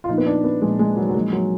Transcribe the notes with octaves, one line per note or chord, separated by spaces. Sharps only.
F4
A#2 F3 D#4
B3
D4
B3
A#2 F3 G#3
G#3
F#3
F#3
A#2 F3 G#3
F#3